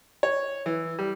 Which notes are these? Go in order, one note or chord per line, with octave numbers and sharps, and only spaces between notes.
C#5
E3
G3